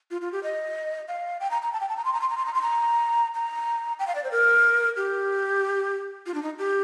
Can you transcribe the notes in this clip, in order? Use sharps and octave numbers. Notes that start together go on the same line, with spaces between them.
F4
F4
G4
D#5
F5
G5
A#5
A#5
A5
G5
A5
A#5
C6
A#5
C6
A#5
C6
A#5
C6
A#5
A#5
G5
F5
D5
C5
A#4
G4
F4
D4
D#4
G4